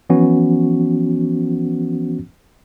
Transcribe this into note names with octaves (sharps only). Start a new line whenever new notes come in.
E3 F3 B3 C#4 F#4